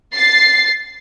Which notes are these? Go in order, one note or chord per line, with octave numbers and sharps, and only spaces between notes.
A6 C7